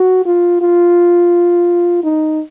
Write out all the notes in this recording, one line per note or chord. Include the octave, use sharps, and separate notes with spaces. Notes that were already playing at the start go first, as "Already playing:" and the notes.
Already playing: F#4
F4
F4
D#4